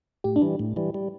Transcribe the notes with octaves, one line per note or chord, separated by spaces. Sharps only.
A2 G4
D4
E3 G3
A2
E3 G3
G3